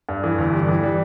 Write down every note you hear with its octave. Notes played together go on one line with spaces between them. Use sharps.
G2
E3
G1
G3
E3
G3